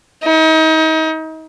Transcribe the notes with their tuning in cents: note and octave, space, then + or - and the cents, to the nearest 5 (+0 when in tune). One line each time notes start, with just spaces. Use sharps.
D#4 +35